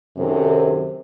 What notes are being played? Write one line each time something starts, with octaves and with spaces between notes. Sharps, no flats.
F#2 C3 D#3 C4 A4